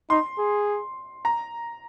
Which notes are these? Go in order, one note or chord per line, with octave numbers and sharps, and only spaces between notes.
D#4 C6
G#4
A#5